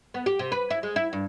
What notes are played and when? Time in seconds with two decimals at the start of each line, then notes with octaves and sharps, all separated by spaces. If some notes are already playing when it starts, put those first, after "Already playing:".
0.14 B3
0.26 G4
0.39 C3
0.52 B4
0.70 E4
0.83 G#3
0.96 E4
1.13 G2